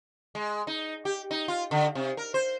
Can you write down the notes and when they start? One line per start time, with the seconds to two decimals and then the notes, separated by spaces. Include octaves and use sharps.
0.35 G#3
0.67 D#4
1.05 G4
1.31 D#4
1.48 F4
1.71 D3
1.95 C3
2.17 A#4
2.34 C5